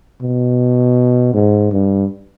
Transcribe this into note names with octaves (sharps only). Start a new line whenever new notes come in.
B2
G#2
G2